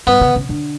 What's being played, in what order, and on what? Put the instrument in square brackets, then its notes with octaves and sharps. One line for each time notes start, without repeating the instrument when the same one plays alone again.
[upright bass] G2 [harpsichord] B3
[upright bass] C#3
C#3
D3